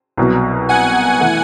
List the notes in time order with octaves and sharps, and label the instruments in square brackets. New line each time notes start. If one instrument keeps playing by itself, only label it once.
[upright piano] C2 B2 F#3
[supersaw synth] F#5 G#5
[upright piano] E3 A3